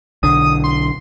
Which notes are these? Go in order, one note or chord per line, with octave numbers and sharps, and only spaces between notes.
B1 D3 D#6
C6